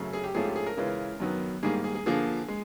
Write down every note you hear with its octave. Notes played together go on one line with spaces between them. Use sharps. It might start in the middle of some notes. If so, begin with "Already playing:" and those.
Already playing: F#2 C#3 F#3 A3
G#4
G4
G#2 F3 A3 C#4 F4 G#4
G4
G#4
A#4
C#3 E3 G#3 C#4 F4
F#2 D#3 F#3 B3
G#2 D#3 G3 A#3 G#4
G#4
G#4
D3 F3 A#3 G#4
G#3